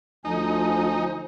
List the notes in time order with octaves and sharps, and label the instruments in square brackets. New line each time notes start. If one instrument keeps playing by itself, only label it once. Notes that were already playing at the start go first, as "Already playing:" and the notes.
[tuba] D2 [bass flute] F3 [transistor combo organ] D#4 [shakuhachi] G#5